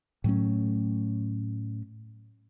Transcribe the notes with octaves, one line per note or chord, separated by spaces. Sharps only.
A2 F#3 A3 C#4